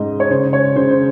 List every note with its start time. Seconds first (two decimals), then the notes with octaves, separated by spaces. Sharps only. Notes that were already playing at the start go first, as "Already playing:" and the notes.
Already playing: G#2 C#4 D#5
0.20 C#5
0.30 C#3 C5
0.53 C#5
0.76 C#3 C5
0.91 C5